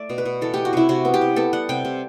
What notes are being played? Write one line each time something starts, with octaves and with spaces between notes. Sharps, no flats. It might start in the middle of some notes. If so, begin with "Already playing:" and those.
Already playing: A3 D5 E5
B2
B4
B2
E3 A4
B3 G4
F#4
C3 E4
C3 F#4
B3
G4
C3
B3 A4
G3 F#5
C3 G5
C3